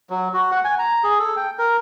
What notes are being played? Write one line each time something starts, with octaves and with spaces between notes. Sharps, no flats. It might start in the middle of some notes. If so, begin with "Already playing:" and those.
F#3
F#4
F#5
G#5
A#5
G#4
A4
G5
A#4